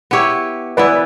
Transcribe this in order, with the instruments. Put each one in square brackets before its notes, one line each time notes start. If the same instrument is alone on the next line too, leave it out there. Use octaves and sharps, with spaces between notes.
[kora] B3 E4 G4 C#5
[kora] E3 B3 E4 [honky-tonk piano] B4 D5